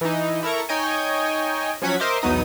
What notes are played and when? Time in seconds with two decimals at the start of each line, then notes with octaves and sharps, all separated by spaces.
0.01 E3 D#4
0.43 E4 A4 A#4 A#5 C#6
0.69 D#4 C#5 D#5 G5 G#5
1.82 F3 F#3 C#4 F#5 G#6 B6
2.00 A#4 C5 D#5 E5 C6 D6
2.22 B1 E2 F#3 B3 D#4 D#6